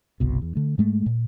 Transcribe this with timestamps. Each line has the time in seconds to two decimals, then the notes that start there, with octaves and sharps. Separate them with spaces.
0.20 G1 C2 B2
0.42 E2
0.55 D3 A3
0.78 G#2 G#3 A3
1.06 A#2